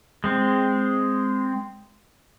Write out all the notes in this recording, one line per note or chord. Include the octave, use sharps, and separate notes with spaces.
G#3 C4